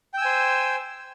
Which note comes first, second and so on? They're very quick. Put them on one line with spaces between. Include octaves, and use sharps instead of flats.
G5 E6 G#5 C5